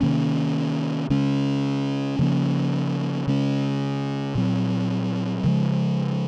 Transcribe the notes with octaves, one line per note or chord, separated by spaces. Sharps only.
C3 D#3 A#3 C#4
C#3 G#3 C#4
C#3 F3 A#3 C#4
C#3 G#3 C#4
A#2 F#3 C4
C#3 F3 G#3